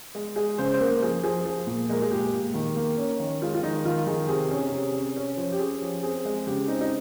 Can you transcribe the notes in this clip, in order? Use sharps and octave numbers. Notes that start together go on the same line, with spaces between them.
G#3
G#3 G#4
C#3 C5
C5
A#3 A#4
F3 G#4
F3 G#4
F3
A#2
G#3 A#4
G#4
A#2 G4
A#2
D#3
A#3
C#4
D#3
G#3 F4
F4
D#3 D#4
D#3 F4
D#3 G#4
C3 G#4
C#4
C3
C#4
C#4
F3
G4
C#4 G#4
F3
C4 G#4
G#3
C#3 G4
C4 D#4
D#4